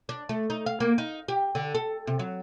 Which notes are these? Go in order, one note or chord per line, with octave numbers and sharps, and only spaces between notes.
D4
A3
D#4
F5
A#3
D#4
G4
D3
A4
C3
F#3